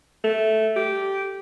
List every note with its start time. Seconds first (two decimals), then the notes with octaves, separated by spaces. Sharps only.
0.24 A3
0.76 G4